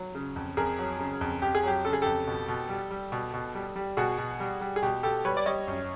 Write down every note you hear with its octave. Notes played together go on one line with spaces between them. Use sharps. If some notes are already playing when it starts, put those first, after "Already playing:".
Already playing: F#3
C#3
F2
F2 G#4 A#4
F#3
C#3
F2
F2 G4
G#4
F#3 G4
C#3 A4
G#4
F2 G4 A4
B2
B2
G3
G3
B2
B2
G3
G3
B2 F#4 G#4
B2
G3
G3
G#4
B2 G4
B2 G4 A4
G3 B4 C#5
D5
G3 C#5 D#5
F#2